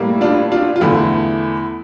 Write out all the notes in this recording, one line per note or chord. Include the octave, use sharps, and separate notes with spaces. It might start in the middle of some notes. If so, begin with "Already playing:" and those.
Already playing: A2 G3 A#3
D4 F4
D4 F4
F4
E2 D3 A3 E4